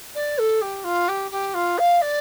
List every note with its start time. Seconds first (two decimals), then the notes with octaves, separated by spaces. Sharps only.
0.15 D5
0.38 A4
0.62 G4
0.84 F4
1.08 G4
1.32 G4
1.54 F4
1.79 F5
2.02 D5